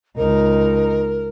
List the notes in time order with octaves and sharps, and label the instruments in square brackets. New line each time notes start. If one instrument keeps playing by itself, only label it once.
[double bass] C#2 D#4 [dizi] A#4